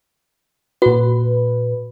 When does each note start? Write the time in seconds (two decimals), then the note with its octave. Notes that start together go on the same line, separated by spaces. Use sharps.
0.82 A#2 F#4 B4